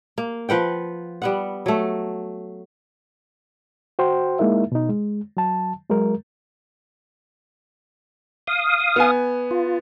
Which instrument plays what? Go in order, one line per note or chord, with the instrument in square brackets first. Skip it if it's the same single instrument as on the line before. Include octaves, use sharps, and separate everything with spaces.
[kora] A#3
F3 B4 F#5 G5
G3 B3 F#5
F#3 A3
[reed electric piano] F#4 C5 G5 C6
G#3 A#3 D#4 E4 A#4 E5
B2 D#4
G#3
F#3 A5
F#3 G#3 A#4
[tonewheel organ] F5 D#6
[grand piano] B3 G#5
[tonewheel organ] F4